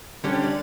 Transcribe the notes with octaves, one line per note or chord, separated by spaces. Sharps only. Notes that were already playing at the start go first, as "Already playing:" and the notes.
D3 G3 C#4 G4
C#5
D5